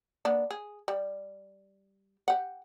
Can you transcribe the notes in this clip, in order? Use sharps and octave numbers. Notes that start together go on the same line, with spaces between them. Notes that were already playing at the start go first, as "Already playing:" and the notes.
A#3 B3 D4
G#4
G3
G4 F#5